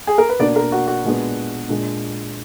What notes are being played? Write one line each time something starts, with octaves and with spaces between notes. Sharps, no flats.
G#4
A#4
B4
B2 A#3 D4 D5
A#4
F#4
F#4
A#2 G#3 B3 D4
A#2 G#3 D4